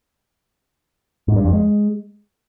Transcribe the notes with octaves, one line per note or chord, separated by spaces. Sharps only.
G#2
G2
F2
G#3